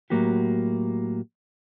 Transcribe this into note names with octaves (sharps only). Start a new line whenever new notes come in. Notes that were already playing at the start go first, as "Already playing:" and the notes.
A2 F#3 A#3 F#4 G4